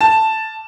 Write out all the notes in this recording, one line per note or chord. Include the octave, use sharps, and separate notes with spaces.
A5